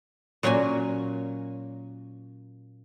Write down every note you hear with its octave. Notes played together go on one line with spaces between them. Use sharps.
A#2 F#3 A#3 C#4 G#5